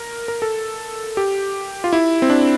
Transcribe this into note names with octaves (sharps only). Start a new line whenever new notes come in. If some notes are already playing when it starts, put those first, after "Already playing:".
Already playing: A#4
A#4
A4
G4
F4
E4
C4
D4